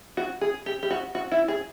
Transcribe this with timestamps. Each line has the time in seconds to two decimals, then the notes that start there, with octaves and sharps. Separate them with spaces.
0.17 F#4
0.41 G#4
0.66 G4
0.83 G4
0.90 F#4
1.15 F#4
1.32 E4
1.48 G#4